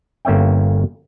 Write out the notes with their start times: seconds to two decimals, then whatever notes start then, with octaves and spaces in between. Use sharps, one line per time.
0.25 G1 A#3 C#4 E5 G5